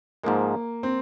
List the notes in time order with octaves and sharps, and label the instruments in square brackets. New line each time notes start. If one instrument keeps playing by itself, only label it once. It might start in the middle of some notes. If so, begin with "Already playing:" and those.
[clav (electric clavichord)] G#2 F3 G#3 [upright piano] A#3
[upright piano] C4